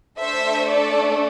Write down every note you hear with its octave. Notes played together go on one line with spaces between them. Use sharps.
A3 D4 A4 C5 E5
A4 D5